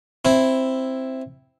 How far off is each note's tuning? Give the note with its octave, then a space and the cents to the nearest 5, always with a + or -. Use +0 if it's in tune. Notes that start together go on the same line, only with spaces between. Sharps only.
C4 +0 E4 +0